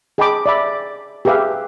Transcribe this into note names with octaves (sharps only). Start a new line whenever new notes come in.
G#4 D#5 G5 A5 B5 D6
D5 E5 B5
G4 G#4 B4 E5 F5